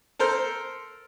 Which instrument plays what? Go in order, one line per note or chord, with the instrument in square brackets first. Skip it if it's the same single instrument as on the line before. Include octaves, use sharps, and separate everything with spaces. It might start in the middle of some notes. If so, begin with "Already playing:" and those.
[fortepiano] A4 A#4 C5